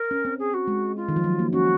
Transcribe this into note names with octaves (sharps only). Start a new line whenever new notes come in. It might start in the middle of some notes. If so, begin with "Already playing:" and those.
Already playing: A#4
C#4
C4
G#4
F#4
G#3
F4
D#3
F3
F#3
A#3
C#4 F#4